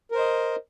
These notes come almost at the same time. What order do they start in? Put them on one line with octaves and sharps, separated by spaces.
A#4 C5 D#5